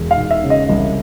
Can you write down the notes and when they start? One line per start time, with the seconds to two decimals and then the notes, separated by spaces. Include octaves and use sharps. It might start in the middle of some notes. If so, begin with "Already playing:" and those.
Already playing: E1
0.11 F5
0.17 E1
0.31 E5
0.44 C#3
0.50 D#5
0.69 C2